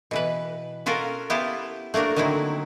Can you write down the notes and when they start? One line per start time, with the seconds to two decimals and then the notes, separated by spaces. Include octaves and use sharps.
0.11 B2 E3 B4
0.86 C#4 F4 F#4 A4 A#4
1.30 B3 E4 F4 G4 A5
1.94 A3 A#3 D4 F#4 A#4
2.16 D3 D#3 F#3 C4 E4